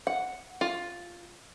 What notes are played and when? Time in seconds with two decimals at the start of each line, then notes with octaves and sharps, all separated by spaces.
0.07 F#5
0.61 F4